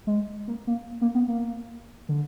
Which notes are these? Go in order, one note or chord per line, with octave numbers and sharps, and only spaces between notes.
G#3
A#3
A#3
A#3
B3
A#3
D3